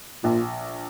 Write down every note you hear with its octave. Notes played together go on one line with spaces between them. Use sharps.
A#1 A#2